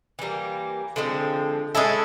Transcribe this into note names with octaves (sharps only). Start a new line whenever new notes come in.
E3 G3 A#3
D3 F3 G#3 C4
G#3 C#4 E4 A4